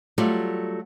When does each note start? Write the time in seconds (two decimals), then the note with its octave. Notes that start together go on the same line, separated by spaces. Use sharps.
0.18 F#3 G3 A3 F4 D5